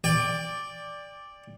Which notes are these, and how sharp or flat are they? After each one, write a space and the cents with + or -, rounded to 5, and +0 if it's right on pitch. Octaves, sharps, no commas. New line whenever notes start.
D5 +0 G5 +30